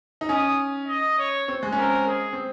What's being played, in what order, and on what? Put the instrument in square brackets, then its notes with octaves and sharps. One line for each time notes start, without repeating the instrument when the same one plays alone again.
[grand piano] D#4
[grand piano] C#4 [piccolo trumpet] D#6
[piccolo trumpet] D#5
C#5
[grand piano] C4
G#3
C#4
[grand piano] C4 [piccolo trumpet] A#4
[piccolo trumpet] G#4
[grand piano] C4